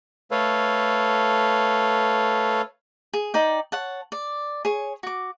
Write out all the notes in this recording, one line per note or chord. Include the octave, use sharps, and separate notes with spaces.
A3 A4 B4 C#5 F5
G#4
D#4 D5 G5
C#5 F#5 A5
D5
G#4 C#5
F#4 D6